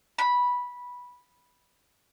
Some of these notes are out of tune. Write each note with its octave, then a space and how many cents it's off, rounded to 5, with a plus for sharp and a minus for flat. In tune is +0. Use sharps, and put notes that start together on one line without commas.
B5 -10